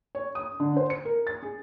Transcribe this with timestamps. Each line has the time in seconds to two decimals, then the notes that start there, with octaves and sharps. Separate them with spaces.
0.15 C#5
0.35 D#6
0.60 D3
0.77 C5
0.90 C#7
1.05 A#4
1.27 A6
1.43 G#4